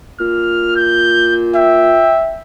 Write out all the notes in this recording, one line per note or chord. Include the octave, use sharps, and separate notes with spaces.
A#2 F6
G6
E5 G5